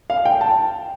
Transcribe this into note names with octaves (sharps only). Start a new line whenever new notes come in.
F5
G5
A5